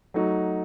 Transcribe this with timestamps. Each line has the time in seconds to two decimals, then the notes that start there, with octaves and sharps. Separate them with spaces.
0.14 F#3 A3 D#4 F#4